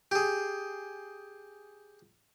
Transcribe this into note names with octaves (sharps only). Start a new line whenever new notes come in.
G4 G#4